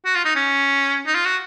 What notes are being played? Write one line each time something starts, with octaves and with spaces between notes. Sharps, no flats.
F#4
F4
D#4
C#4
D#4
F4
F#4